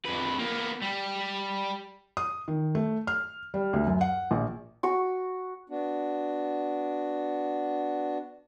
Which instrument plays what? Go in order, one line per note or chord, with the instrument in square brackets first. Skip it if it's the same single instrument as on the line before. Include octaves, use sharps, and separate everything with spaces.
[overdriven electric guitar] F2 B4
A#3 B3
G3
[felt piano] D#6
D#3
A3
F6
G3
D2
F#2
F#5
A#1
[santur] F#4 C#6
[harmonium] B3 D4 F#4